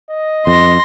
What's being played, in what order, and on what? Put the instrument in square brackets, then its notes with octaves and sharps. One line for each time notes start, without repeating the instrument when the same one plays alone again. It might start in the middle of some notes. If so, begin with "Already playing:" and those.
[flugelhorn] D#5
[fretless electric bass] F2 [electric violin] C6 A#6